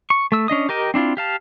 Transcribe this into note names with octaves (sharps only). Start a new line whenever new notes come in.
C#6
A3 E6
C#4 D4 D#5 D#6
G4 A#4 D#5 G5
C4 D4 E4 F4
G4 F5 A5